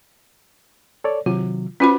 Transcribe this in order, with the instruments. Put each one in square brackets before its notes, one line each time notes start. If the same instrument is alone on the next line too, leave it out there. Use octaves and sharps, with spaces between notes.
[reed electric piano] A4 C#5 D5
[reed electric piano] C3 D#3 F#3 [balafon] F4
[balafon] C#4 F4 B5 [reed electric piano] F#4 B4 C5